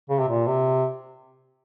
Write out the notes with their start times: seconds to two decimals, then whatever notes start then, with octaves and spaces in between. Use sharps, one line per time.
0.09 C#3
0.19 C3
0.28 A#2
0.47 C3